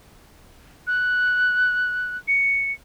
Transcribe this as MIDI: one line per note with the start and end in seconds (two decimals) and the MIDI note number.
0.87 2.17 90
2.28 2.72 97